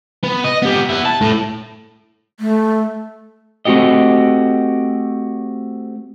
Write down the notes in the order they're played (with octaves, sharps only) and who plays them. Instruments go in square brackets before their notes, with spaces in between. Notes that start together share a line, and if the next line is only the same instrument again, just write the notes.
[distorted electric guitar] B3
D#5
B3 G4
B3 E4
A5
A2
[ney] A3
[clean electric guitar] A3 C4 F#4 G4 D#5